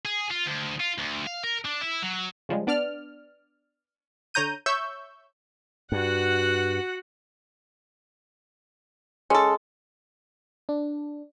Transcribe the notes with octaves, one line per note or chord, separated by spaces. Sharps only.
G#4
F4
D2
F4
D2
F5
A#4
D4
E4
F#3
C#3 F3 G3 G#3
B3 D4 D5 F6
D3 C#5 A#5 G6 D#7
C#5 E5 C#6 E6 G6
G2 F#4 F#5
G#3 C#4 A4
D4